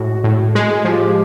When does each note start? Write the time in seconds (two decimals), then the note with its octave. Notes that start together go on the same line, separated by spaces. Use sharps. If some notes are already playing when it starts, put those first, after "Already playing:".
Already playing: A2 G#3 F#4
0.24 A2
0.55 G#3
0.85 F3 G4